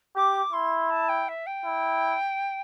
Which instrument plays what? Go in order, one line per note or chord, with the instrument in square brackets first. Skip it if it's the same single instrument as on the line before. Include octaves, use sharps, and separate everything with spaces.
[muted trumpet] G4 [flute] D6
[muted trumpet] E4 [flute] C6
[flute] A5
G5
E5
G5
[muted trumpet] E4